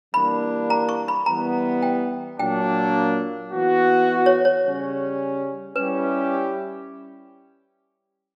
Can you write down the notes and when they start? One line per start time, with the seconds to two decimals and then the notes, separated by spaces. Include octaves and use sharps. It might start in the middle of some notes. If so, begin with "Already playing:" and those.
0.14 E3 G3 A#3 D4 B5
0.70 A#5
0.89 C#6
1.08 B5
1.26 E3 G3 B3 A#5
1.82 G5
2.39 A#2 F#3 A#3 D4 G5
3.52 E3 B3 F#4
4.26 C#5
4.45 C#5
4.64 C#3 G3 C#4
5.76 G3 C#4 E4 G4 B4